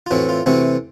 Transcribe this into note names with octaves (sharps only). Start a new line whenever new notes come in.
F4
A2 E3 A3 C4 F#4
F4
C3 E3 A3 C4 F#4